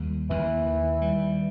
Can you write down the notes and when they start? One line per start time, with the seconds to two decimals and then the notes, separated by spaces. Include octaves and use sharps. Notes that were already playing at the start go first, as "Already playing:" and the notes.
Already playing: D#2 G3
0.30 D#2 E3
0.67 D#3
1.02 G3